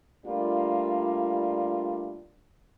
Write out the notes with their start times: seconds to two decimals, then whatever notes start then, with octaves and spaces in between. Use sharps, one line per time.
0.25 G3 A3 A#3 D4 F4